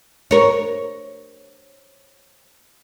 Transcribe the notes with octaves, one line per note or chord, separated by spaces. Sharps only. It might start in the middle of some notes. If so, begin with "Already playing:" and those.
A#4 C#5